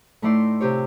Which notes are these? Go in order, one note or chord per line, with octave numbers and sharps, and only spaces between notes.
A2 A3 D#4 E4 D5 C6
C3 F4 G4 C#5